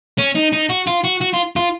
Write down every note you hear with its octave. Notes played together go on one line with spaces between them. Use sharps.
C#4
D#4
D#4
F#4
F4
F#4
F#4
F4
F4